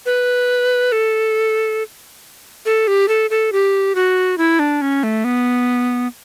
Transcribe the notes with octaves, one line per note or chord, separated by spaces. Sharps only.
B4
A4
A4
G4
A4
A4
G4
F#4
E4
D4
C#4
A3
B3